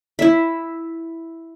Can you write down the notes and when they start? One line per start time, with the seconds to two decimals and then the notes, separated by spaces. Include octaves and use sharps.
0.19 E4 E5